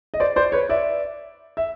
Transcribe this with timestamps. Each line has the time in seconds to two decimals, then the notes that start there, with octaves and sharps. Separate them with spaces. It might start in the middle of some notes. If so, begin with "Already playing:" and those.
0.14 D#5
0.20 C5 D5
0.36 C5 D5
0.52 B4 C#5
0.69 D5 E5
1.57 E5